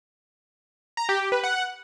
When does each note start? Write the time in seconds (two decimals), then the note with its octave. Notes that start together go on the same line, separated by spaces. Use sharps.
0.97 A#5
1.09 G4
1.20 G4
1.32 B4
1.44 F#5